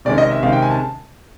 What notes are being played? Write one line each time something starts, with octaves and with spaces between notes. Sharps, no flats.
C3 D#3 G#3 C#4 D5
D#5
E5
C3 D#3 G#3 C#4 F5
G5
G#5
A5